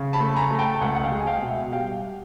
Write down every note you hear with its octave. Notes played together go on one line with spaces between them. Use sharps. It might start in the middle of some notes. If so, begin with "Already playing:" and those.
Already playing: C#3
A5 B5
A3
B5
G#5 A#5
A3 A#5
G5 A5
A5
C#2 F#5 G#5
F#5
F5 G5
G#3
G#5
F5 G5
B2 G5
E5 F#5
G3 F5 G5